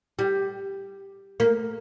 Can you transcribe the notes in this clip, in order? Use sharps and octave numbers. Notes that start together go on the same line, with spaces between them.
G3
A#3